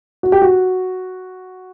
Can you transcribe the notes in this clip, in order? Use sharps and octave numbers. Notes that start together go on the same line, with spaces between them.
F#4
G4
F#4